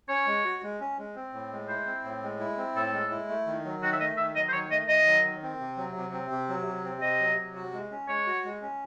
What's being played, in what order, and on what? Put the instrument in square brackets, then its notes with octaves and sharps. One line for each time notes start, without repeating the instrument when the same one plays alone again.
[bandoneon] C#4 [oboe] C#5
[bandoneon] G#3
F#4
G#3
C#4
G#3
C4
A2
G#3
[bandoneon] E4 [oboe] C5
[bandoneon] C4
A2
G#3
E4
C4
[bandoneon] A2 [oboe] A4
[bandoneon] G#3
E4
A3
D#3
F#3
[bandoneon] D#3 [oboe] F#4
[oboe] E5
[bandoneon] A3 [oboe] D#5
[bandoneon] D#3 [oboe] E5
[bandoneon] F#3 [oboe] D#5
[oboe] C5
[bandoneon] D#3 [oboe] C#5
[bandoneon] A3 [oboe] D#5
[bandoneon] D#3 [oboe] D#5
[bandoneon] F#3
D#3
C4
C3
F#3
C3
C4
C3
F#3
C3
C4
[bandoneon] C3 [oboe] D#5
[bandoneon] F#3
C3
F#4
G#3
C#4
[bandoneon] G#3 [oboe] C#5
[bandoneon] F#4
G#3
C#4